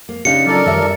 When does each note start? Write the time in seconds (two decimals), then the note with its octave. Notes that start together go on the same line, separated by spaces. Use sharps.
0.09 A#3
0.25 C#3 D4 D#4 G4 C#5 F5 C#7
0.46 F#3 F4 A4 A#4 D5
0.66 F#2 D#3 F#3 G3 C#5 E5
0.82 E5